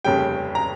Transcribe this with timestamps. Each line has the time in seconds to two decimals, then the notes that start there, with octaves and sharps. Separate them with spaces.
0.05 F1 D#2 C#3 G3 G5
0.55 A#5